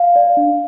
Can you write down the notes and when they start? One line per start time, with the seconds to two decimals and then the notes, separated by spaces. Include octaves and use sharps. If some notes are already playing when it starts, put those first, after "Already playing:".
Already playing: F5
0.16 D5
0.37 D4